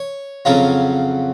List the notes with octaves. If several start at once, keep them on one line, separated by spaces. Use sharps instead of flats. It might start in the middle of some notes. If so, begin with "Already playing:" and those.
Already playing: C#5
F2 C#3 F#3 C#4 F4